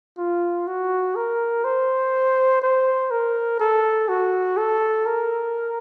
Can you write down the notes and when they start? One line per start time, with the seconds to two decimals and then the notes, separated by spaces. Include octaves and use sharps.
0.18 F4
0.67 F#4
1.15 A#4
1.64 C5
2.62 C5
3.11 A#4
3.59 A4
4.09 F#4
4.57 A4
5.06 A#4